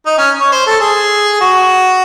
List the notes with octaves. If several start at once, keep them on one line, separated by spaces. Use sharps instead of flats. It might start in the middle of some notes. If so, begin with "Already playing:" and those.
D#4
C#4
C#5
C5
A4
G#4
F#4